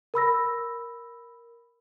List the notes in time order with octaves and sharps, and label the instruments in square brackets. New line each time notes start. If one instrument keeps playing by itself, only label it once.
[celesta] A#4 B5 E6 A#6